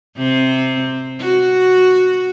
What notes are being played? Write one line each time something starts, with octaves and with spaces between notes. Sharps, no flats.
C3 C4
F#4